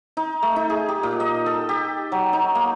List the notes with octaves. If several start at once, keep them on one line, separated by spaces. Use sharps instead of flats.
D#4
A3
D#4
G#4
G4
A#2
D#5
A4
G4
F#3
D#4
A#3